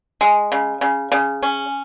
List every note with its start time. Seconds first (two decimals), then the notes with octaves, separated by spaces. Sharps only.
0.21 G#3
0.52 C#3
0.81 C#3
1.12 C#3
1.43 C#4